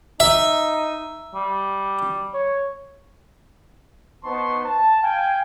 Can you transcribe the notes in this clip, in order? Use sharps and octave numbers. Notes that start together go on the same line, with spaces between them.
D#4 E5
G3
C#5
B3 D#4 C5 A5 C6 C#6
A5
F5 G5 G#5